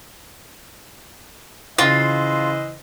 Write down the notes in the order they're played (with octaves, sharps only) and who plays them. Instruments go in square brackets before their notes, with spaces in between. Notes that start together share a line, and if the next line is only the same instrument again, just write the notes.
[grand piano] C#3 A#6 [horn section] E3 C5 D#5 [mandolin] F4